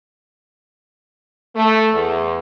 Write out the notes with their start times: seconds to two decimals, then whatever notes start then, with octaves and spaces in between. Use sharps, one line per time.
1.55 A3
1.93 E2